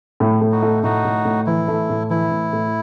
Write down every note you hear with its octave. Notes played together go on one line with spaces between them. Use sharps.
A2
A2
D#4 F#4
A3
A2 D#4 F#4
A2
A2
E3 E4
A3
A2
E3 E4
A2
A2